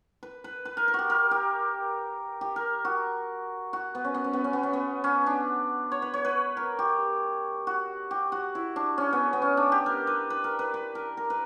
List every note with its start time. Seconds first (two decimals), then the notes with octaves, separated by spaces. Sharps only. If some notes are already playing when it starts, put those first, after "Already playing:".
0.23 B4
0.44 B4
0.65 B4
0.77 A#4
0.88 A#4
0.94 F#4 G4
1.10 A#4
1.31 G4
2.41 G4
2.56 A#4
2.85 F#4
3.73 F#4
3.95 B3
4.05 C#4
4.14 B3
4.24 C#4
4.33 B3
4.44 C#4
4.53 B3
4.63 C#4
4.73 B3
5.04 C#4
5.27 D4
5.92 C#5
6.02 B4
6.14 C#5
6.25 B4
6.57 A#4
6.79 G4
7.67 F#4
8.11 G4
8.32 F#4
8.55 E4
8.76 D4
8.98 C#4
9.13 B3
9.33 B3
9.42 C#4
9.57 D4
9.72 G4
9.86 A#4
10.07 B4
10.30 B4
10.44 A#4
10.59 B4
10.74 B4
10.95 A#4
11.17 A#4
11.30 B4